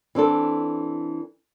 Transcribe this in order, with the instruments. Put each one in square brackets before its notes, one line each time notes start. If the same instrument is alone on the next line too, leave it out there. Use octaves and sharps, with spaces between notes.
[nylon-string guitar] E3 C4 D4 A4